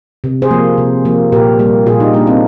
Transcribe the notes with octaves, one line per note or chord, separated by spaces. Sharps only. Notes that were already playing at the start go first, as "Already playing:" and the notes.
C3
G#4 C5
F3 A#3
C3
F3 A#3
A#2 G4 A#4
G3 A#3
A#2 F4 G#4
D#4 G4
G3 A#3 D4 F4
C4 D#4